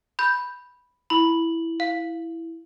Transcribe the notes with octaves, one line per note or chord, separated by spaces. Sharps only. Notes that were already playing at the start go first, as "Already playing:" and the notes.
B5 G6
E4 B5 F#7
F5